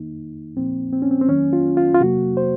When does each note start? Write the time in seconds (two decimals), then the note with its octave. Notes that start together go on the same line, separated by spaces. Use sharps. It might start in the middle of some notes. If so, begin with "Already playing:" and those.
Already playing: D#3 A#3 D#4
0.57 A#2 F3 A#3 C4
0.93 C4
1.02 C#4
1.11 C4
1.21 C4
1.29 D#3 F#3 A#3 C#4
1.53 F4
1.77 F4
1.95 F4
2.01 C3 F#3 A#3 F#4
2.37 C5